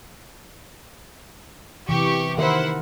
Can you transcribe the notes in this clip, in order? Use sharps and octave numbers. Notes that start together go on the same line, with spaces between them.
C3 E3 G4 C#6
D#3 E4 A#4 C5 E5 F#5